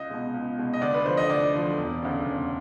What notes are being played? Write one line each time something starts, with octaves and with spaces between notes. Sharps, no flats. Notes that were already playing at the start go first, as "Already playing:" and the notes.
Already playing: C#2 D#5
B2 G#3
C#2
B2 G#3
D#5
D2 D5
B4
D3 F3 C5
D#5
D2 D5
D3 F3
E1
D2 C#3
E1